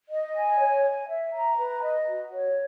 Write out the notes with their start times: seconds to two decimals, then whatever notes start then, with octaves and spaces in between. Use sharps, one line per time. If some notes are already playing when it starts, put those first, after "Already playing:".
0.10 D#5
0.34 G#5
0.59 C#5
0.84 G#5
1.08 E5
1.32 A#5
1.57 B4
1.83 D#5
2.07 F#4
2.32 C#5